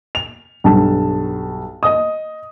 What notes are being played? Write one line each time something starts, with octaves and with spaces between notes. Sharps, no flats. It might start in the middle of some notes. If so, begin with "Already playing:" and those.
F7
B1 G2 A5
D#5 D#6